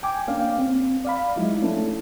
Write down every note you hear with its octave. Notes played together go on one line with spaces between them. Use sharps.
G5 G#5 D6
A#3 C#4 D4 F5 G5
C4
D5 F5 B5
F3 F#3 G#3 D#4 E4
A3 C#4 D4 E4 A4